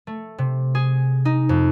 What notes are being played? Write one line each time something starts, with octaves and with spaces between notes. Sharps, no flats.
A3
C3
G#4
D#4
F2